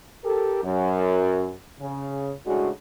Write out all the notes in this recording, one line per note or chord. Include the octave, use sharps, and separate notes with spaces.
G4 A4 A#4
F#2
C#3
A2 C#3 G#3 D4 F#4